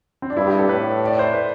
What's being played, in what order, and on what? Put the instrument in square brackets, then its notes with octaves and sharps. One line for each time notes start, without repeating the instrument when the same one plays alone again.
[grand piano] C4
D4
[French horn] G2 [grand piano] E4
[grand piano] G4
A4
[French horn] A2 [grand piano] B4
[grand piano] D5
C5
B4